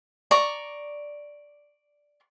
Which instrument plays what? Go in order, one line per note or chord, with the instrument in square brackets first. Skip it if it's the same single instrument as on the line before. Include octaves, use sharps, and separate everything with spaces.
[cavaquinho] D5 A#5 C#6